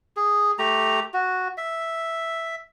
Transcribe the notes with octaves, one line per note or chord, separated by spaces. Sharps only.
G#4
A3 G4 A#5
F#4
E5